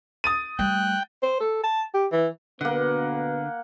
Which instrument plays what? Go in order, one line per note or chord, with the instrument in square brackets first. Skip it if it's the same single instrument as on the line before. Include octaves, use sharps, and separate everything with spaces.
[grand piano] D#6 A6 D#7
[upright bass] G3 A3 [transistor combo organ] G5 [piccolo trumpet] F#6
[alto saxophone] C5
A4
A5
G4
E3
[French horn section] D2 B2 B4 [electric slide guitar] D3 [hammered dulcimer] A#3 F#5 [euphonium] B3